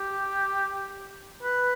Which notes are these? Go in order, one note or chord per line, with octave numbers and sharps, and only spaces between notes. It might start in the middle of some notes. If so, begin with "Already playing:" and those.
Already playing: G4
B4